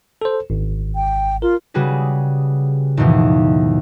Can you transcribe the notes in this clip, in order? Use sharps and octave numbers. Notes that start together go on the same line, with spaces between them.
A4 C5
G#1
G5
F4 A#4
C#3 G3 F#4 G#4 B4
D#2 G#2 B2 E3 F3